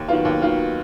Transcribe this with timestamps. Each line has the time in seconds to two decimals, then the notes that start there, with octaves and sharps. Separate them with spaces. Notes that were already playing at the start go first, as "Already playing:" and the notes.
Already playing: D#2
0.08 D#3 F#3 B3 F4
0.25 D#2
0.42 D#3 F#3 B3 F4